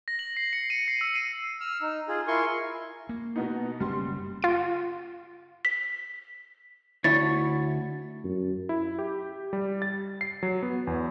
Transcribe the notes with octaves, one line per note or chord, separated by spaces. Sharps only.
A#6
F#7
C7
C#7
D#7
C7
E6
D#7
E6 F6
D#4
F4 G#4
E4 F4 A#4 G#5 C6 C#6
A#3
B2 B3 D#4
F#1 G3 A#3 C#4 C6
F4 D7
B6
D2 E4 C#5 A6
F#2
E4
G4
G3
A6
C7
F#3
B3
E2